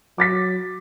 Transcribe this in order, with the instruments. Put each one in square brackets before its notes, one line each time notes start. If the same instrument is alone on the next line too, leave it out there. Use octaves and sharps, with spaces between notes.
[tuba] F#3 [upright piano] D6 A6 B6